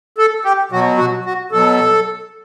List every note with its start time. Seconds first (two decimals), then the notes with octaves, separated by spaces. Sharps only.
0.18 A4
0.45 G4
0.72 B2 F#3 F#4
0.98 F#4
1.25 F#4
1.51 B2 F#3 A4